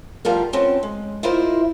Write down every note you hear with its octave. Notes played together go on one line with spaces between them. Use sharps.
B2 F3 G3 F4 A#4
B2 F3 C4 C#4 G5 A5
G#3
E4 F4 A#4 C5 D#5